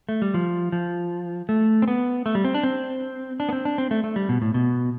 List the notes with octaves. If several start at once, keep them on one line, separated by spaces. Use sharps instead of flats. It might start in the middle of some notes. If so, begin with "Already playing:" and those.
A3
G3
F3
F3
A3
C4
B3
A3
G3
C4
D4
C4
D4
B3
C4
D4
C4
A3
A3
G3
B2
A2
B2